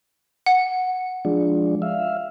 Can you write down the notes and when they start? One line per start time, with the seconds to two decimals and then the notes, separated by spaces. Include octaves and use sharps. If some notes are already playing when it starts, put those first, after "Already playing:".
0.46 F#5
1.25 F3 G#3 D4
1.82 E5 F5